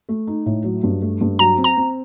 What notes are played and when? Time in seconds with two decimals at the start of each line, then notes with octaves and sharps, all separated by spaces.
0.09 A3
0.27 D#4
0.46 A2
0.64 F#3
0.83 G2
1.02 A3
1.21 G2
1.39 F#3 A#5
1.58 C4
1.64 A#5
1.77 C4